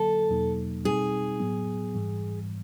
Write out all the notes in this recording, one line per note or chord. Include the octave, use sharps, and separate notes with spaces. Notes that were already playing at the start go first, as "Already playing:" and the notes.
Already playing: D3 F#3 A#3 A4
E2 B2 F#3 A#3 D#4
B2 G3 C4 D#4 G#4
A2 F#3 B3
G#2 E3 G3